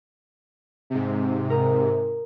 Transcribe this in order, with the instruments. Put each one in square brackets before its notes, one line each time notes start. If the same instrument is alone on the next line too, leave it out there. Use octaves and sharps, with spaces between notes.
[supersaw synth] G#2 C3
[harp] A#4 A#5 D#6